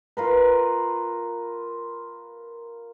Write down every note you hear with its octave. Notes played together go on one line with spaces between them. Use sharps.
F4 A#4 B4